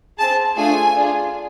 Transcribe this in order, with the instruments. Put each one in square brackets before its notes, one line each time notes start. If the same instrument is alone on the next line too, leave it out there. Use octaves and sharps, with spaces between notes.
[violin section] C4 G#4 A5
A3 D4 F4 G#4 G#5
D4 F4 G#4